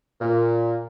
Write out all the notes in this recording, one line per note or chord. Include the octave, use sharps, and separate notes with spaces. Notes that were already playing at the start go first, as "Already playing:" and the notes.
A#2